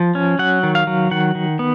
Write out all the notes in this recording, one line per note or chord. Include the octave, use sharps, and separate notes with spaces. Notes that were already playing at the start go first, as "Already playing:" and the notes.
Already playing: F3
C#4
F#3 F#5
D#3
F5
F#3
D#3 F#5
D#3
B3